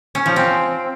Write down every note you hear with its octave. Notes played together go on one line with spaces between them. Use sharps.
C#4
F3
C4